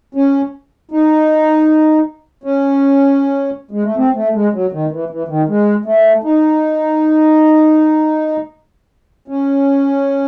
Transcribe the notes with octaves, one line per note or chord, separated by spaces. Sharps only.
C#4
D#4
C#4
G#3
A3
C4
A3
G#3
F#3
D#3
E3
E3
D#3
G#3
A3
D#4
C#4